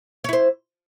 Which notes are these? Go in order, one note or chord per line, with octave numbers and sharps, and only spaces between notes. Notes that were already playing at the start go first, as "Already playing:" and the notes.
E4 C5 C#5